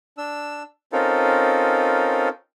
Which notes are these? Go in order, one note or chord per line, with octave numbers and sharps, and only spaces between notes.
D4 E6
C4 C#4 D#4 F4 A4 A#4